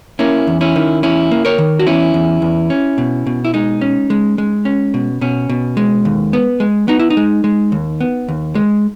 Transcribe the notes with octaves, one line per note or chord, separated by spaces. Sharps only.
A#3 C#4 E4
E2
C#4 E4
D#3
E2 C#4 E4
A#3
A#4 C#5
D#3
F#4
E2 C#4 E4
E2
E2
C#4
B2
B2
E4
G#3 D#4
C#4
G#3
G#3
C#4
B2
B2 C#4
B2
G#3
D#2
B3
G#3
B3 D#4
E4
D#4
G#3
G#3
D#2
B3
D#2
G#3